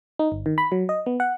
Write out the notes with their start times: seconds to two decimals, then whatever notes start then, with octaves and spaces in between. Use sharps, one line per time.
0.19 D#4
0.32 G1
0.46 D#3
0.58 B5
0.72 F#3
0.89 D#5
1.06 B3
1.20 F#5